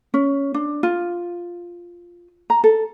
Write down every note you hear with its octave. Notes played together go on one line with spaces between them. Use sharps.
C#4
D4
F4
A#5
A4